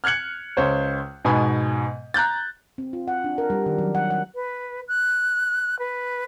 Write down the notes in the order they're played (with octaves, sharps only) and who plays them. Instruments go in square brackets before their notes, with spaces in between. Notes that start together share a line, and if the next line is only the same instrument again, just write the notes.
[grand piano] F6 F#6 G#6 C#7 F#7
C#2 C5 C#5
G#2 B2 B3 G#5 B5
A#5 F#6 G6 A6
[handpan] C4
F4
F#5
D4
A#4
G3
D#3
F#3
F#5
F#5
[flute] B4
F#6
B4